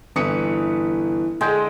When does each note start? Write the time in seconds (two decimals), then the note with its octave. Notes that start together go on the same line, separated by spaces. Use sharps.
0.16 G1 E3 D#6 C#7
1.41 D3 G#3 G5